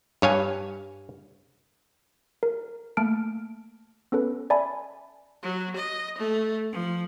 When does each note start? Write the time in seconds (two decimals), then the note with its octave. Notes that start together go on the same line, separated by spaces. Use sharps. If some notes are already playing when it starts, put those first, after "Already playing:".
0.22 G2 C#5 F5 G#5
2.43 A#4
2.97 A3 A#3 A5 F6 D7
4.12 B3 C#4 A4 B4
4.50 D5 E5 G#5 A5 B5
5.42 F#3
5.75 D#5
6.18 A3
6.72 F3